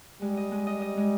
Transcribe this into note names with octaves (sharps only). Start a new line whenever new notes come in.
G3 G#3
D#5
G#3
D#5
D#5
G#3